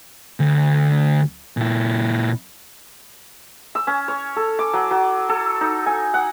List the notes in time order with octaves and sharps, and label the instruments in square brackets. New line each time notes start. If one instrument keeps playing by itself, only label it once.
[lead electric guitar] D2
A#2 E4
[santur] E6
C#4
C#5
A4
D6
F#3
F#3
A4
D#4
G#5
F#5